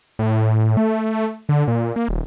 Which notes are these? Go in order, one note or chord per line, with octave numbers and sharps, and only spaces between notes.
A2
A3
D3
A#2
A#3
D#1